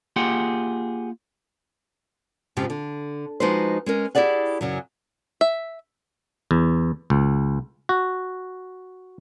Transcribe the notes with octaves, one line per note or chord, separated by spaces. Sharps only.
A#3 F4 G4 G#4 F#5 G5
F2 G#2 C#3 F3 G4
D3
F3 G#3 D#4 F#4 B4 C5
G#3 C#4 A#4
E4 G4 G#4 D5 F#5
F#2 C#3 F#3
E5
E2
C#2
F#4